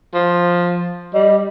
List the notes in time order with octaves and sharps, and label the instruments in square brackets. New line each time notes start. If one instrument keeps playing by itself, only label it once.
[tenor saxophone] F3
[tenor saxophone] G3 [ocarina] D#5